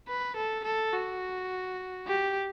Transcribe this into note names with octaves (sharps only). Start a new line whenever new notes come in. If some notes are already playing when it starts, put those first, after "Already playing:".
B4
A4
A4
F#4
G4